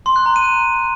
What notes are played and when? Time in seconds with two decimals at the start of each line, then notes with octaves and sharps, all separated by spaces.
0.06 C6
0.16 F#6
0.26 A#5
0.36 D#7